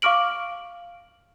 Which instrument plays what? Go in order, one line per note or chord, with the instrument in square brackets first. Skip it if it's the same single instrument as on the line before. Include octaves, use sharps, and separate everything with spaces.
[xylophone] F5 C#6 D6 F6 D7 F#7